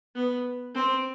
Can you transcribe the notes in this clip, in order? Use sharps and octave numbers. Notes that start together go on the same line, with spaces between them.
B3
C4